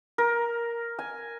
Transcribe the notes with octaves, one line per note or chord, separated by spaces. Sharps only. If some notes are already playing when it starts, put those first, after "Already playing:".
A#4
G#5